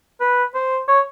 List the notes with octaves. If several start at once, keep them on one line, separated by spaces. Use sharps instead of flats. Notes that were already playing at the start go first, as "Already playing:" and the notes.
B4
C5
C#5